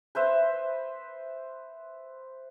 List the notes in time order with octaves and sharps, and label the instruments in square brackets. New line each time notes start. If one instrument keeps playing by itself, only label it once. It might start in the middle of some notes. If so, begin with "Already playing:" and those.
[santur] B4 C5 E5